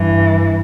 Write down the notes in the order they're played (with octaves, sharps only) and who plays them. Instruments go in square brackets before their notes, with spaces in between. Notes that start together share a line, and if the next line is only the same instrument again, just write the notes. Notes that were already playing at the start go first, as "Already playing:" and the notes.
Already playing: [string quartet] G2 E3